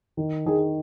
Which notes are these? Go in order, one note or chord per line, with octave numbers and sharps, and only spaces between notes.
D#3
D#3 G#4